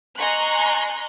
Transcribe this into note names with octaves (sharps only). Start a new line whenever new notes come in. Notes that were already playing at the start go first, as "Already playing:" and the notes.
D#5 G#5 A#5 C6 C#6 F#6